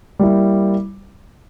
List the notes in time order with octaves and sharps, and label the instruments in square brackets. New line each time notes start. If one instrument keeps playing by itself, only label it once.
[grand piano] G3 A#3 E4